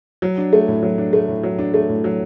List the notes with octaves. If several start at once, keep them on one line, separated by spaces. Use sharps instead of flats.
F#3
D4
A3
A2
F#3
D4
A3
A2
F#3
D4
A3
A2
F#3